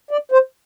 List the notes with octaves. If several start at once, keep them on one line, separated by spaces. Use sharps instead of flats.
D5
C5